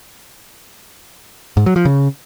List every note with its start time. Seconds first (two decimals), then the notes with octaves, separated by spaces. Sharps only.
1.57 G#2
1.66 F#3
1.76 F3
1.85 C#3